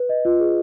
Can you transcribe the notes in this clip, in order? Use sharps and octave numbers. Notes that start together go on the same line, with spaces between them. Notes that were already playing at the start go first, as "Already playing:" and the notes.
Already playing: B4
D#5
F4
G#4